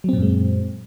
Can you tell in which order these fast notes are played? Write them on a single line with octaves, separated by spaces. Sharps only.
F#3 C4 A#2 F#2 G#3